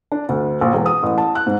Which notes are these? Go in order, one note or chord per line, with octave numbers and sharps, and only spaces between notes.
D4
D2
A#1
E1
D#6
A1
A5
F#6
G#2